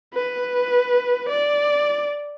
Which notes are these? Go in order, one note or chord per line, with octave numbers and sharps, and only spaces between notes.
B4
D5